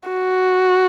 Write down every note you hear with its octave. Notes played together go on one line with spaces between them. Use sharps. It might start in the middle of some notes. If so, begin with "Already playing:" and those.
F#4